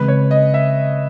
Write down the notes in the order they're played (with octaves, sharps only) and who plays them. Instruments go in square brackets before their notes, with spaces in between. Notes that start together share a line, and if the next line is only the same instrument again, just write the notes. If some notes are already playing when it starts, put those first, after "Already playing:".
Already playing: [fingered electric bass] C#3 E3 G#3 C4 [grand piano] B4
[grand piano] C#5
D#5
E5